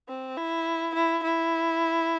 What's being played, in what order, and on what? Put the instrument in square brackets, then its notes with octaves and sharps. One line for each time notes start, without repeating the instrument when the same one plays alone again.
[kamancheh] C4
E4
E4
E4